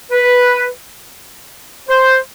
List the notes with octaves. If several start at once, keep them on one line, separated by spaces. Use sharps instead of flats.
B4
C5